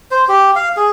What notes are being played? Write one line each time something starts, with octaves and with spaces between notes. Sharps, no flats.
C5
G4
F5
G#4